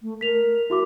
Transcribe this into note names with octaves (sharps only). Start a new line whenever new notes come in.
A3
A#4 B6 F7
E4 F#4 E5 D6